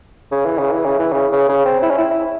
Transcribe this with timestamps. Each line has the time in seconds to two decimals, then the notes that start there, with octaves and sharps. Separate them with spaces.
0.32 C#3
0.45 E3
0.59 C#3
0.72 E3
0.86 C#3
0.99 E3
1.13 C#3
1.32 C#3
1.49 C#3
1.65 C4
1.83 E4
1.90 C#4
1.98 E4